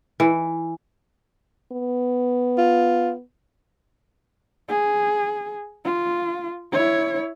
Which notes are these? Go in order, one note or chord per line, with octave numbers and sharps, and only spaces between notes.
E3
B3
F4
G#4
F4
E4 C#5